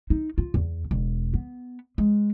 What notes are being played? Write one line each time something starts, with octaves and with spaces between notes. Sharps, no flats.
D#4
F4
E2
E1
B3
G#3